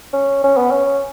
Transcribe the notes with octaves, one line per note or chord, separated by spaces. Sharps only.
C#4
C#4
B3
C#4